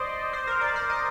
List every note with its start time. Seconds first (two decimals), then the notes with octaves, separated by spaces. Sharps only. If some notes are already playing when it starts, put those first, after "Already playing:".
Already playing: C5 D5 D#5
0.33 C5
0.47 A#4
0.61 D5
0.76 C5
0.90 D#5